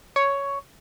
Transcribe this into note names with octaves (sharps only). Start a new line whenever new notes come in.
C#5